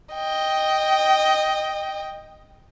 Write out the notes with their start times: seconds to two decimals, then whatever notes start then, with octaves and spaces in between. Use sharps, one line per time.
0.15 D#5 G5